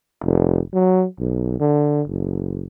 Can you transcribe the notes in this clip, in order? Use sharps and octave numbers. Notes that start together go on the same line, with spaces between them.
F1
F#3
B1
D3
F#1